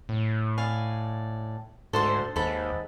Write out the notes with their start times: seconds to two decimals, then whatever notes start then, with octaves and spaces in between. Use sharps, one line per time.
0.09 A2
0.58 D5 F5 G#5
1.93 D2 G#2 A4 C5 C6
2.36 D#2 G#2 A4 B5